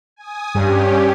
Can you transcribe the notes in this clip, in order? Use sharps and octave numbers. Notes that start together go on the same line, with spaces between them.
G#5 D#6
G2 C#4 G4